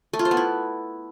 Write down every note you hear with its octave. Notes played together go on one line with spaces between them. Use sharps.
A3
F4
C5
B3
E4